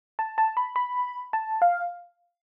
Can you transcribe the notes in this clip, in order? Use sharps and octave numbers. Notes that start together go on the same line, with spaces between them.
A5
A5
B5
B5
A5
F5